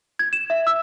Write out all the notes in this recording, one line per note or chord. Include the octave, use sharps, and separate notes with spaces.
G#6
E7
E5
E6